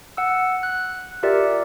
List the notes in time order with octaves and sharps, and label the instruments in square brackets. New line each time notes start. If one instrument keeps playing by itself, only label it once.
[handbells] F#5 E6
F#6
F4 G4 A#4 D5 E5